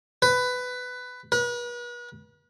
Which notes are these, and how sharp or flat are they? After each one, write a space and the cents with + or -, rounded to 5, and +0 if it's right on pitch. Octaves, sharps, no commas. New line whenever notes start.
B4 +15
B4 -40